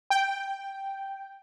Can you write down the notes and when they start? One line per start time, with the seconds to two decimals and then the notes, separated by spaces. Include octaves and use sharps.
0.10 G5